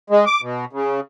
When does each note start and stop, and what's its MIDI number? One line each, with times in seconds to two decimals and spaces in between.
0.10 0.25 56
0.26 0.41 86
0.42 0.65 47
0.73 1.00 49